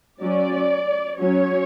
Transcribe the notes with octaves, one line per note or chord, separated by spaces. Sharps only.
F#3 C#4 D5
F#3 C#4 C#5